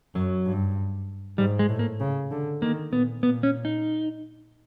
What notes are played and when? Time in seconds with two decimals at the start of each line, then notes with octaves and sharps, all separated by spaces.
0.15 F#2 F#3
0.46 G2
1.38 G#2 G3
1.59 G#3
1.69 A2
1.79 A#3
2.00 C#3
2.31 D3
2.62 D#3 A#3
2.92 A#2 B3
3.23 A#2 B3
3.43 C#4
3.65 D#4